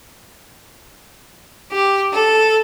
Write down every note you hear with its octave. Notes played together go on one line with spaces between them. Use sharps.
G4
A4